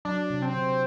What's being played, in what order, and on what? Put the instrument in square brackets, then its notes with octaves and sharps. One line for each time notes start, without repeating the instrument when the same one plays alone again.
[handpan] F#3 [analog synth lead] D4
[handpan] C3
[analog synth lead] C4
[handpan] D3